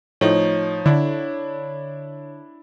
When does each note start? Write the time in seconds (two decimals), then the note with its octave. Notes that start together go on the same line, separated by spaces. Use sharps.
0.21 A2 F3 D#4 C#5
0.86 D3 D4 E4